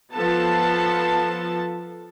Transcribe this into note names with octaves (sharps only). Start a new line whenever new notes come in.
F3 B3 A4 A5